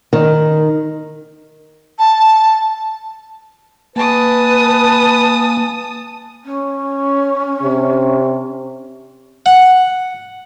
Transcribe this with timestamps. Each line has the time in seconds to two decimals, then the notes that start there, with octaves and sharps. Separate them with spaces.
0.13 D#3
1.99 A5
3.96 A#3 B4 G#5 A5 D#6
6.45 C#4
7.63 C3
9.46 F#5